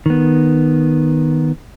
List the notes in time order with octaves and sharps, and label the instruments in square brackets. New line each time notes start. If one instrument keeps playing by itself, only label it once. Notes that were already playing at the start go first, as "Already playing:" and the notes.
[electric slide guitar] D#3 B3